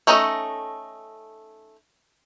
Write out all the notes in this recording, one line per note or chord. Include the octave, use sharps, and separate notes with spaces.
A3 C#4 D#4 A4 D#5